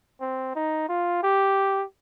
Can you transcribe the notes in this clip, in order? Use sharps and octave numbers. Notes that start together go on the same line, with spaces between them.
C4
D#4
F4
G4